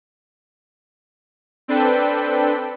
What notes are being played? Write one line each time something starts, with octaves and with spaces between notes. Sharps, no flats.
C4 D4 A4 B4 G5